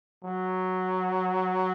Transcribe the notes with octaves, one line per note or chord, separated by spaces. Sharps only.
F#3